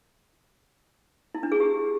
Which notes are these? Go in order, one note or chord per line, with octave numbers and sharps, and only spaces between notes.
E4
D4
G#4
G4